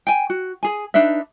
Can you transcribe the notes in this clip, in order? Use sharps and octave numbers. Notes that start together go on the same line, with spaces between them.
G5 G#5
F#4
G#4 G#5
D4 D#4 B4 E5